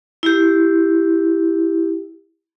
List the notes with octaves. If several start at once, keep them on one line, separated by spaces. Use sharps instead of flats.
E4 G4